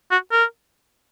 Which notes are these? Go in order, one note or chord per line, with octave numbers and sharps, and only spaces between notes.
F#4
A#4